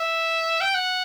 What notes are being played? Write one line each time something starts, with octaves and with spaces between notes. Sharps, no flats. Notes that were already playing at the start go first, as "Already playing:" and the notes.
Already playing: E5
G5
F#5